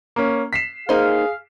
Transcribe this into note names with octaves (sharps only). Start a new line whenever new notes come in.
A#3 C#4
B6 C7 E7
A#3 D#4 G#4 C5 F5